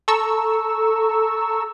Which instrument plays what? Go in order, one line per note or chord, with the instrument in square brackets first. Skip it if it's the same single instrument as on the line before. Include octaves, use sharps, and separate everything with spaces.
[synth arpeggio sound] A4 A#5 C#6 E6